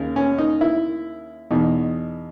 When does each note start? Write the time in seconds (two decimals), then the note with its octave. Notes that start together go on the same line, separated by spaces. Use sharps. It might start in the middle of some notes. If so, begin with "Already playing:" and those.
Already playing: D#2 C#3
0.16 C#4
0.38 D#4
0.61 E4
1.51 E2 B2 D#4